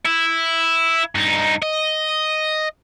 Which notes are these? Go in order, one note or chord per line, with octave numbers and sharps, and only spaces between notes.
E4
G2 D#4
D#5